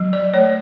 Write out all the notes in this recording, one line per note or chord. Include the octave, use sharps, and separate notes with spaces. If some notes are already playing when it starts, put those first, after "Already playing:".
Already playing: F#3
D5
A3 C#5